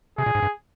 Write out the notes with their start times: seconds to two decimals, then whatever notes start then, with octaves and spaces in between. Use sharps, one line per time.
0.18 C3 G#4
0.26 A#2
0.35 G#2
0.42 G2